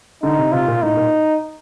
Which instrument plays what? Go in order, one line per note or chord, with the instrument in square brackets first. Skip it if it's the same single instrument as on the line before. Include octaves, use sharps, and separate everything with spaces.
[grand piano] D3 [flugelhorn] D#4
[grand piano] C3
[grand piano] C3 [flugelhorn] F4
[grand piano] A#2
[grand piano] A2 [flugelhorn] D#4
[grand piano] A#2